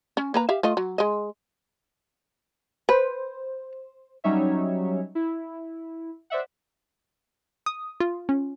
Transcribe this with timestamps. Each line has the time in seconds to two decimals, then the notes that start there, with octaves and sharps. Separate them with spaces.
0.17 C#4
0.34 A#3 B4 A#5
0.49 G4 E5 F5
0.63 A3 F4 D#5
0.77 F#3
0.98 G#3 D#5
2.89 B4 C5
4.24 F#3 G3 C#4 D#4 C#5 E5
5.15 E4
6.30 C5 D5 E5 F#5
7.66 D#6
8.00 F4
8.29 C#4